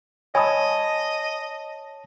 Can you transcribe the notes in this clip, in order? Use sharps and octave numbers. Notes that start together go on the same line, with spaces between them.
C#5 D#5 G#5 A5 B5 D#6